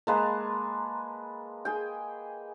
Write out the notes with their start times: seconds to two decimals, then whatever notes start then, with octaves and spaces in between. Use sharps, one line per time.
0.07 G#3 A#3 B4 A5 A#5
1.65 G#4 G5